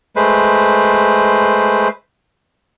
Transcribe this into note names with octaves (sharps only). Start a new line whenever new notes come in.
G#3 A3 B4 C5